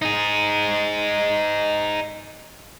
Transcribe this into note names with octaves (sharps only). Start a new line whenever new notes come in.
D#4 G#4